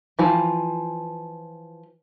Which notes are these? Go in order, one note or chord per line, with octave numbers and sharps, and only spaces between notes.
E3 F3